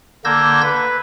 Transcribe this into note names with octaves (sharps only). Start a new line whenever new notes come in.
D3 A#3 E6 G6 G#6 A#6
B4